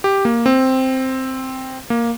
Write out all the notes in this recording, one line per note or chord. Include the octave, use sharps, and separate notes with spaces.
G4
A#3
C4
A#3